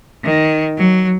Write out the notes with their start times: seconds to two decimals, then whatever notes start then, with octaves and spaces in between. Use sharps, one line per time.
0.24 D#3
0.78 F#3